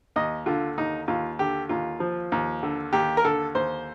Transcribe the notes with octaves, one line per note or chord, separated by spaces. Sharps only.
D#2 D#5
D3 F4
D#2 D#4
D#2 F4
D3 G4
D#2 F4
F3
D#2
D3
D#2 G4
A#4
D3 A4
D#2 C5